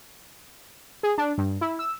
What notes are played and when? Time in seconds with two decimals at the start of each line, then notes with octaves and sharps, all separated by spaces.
1.03 G#4
1.18 D4
1.38 G2
1.61 E4
1.79 E6